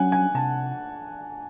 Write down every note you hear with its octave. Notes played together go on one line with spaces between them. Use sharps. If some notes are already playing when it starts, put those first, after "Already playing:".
Already playing: F#3 C#4 F#5 G#5
G#5
C3 A5